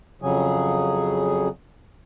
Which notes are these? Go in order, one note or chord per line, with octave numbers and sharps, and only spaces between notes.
F2 C#3 F#3 G#4